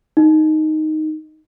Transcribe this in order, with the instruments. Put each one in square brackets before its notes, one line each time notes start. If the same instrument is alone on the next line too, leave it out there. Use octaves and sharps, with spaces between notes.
[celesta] D#4